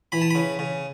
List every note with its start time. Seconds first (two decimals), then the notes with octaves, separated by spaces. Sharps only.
0.12 E3 B5
0.21 A5
0.30 C#3 B5
0.59 C#3